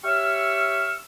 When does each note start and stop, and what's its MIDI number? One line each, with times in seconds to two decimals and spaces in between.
0.05 0.96 67
0.05 0.96 73
0.05 0.96 76
0.05 0.96 85
0.05 0.96 88
0.05 0.96 89